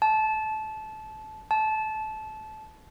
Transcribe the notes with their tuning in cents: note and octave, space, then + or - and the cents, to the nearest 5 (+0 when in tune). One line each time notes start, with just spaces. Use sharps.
A5 -20
A5 -20